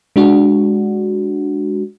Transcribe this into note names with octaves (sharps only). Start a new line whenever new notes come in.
G#3 D4 F#4